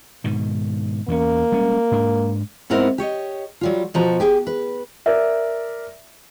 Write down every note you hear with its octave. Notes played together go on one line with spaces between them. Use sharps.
G#2 B2 D#3
E2 A#3 C4 C#4
G3 G#3 C#4
G#2 D4
G#2 B3 C4 E4 A#4 F#5
G4 C#5 D#5
F#3 G3 F4
B2 F3 F#4 A#5
G4 G#4 G5
B4
A#4 D5 E5